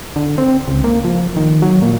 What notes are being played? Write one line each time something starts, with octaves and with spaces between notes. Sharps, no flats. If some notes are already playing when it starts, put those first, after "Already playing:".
D3
C4
C#2
A#3
F3
D#3
F#3
A#2